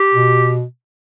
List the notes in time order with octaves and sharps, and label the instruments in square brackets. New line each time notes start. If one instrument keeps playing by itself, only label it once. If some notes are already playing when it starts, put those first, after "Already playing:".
Already playing: [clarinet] G4
[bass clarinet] B2